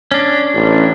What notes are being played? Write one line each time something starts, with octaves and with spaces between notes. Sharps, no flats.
C#4 D4
A1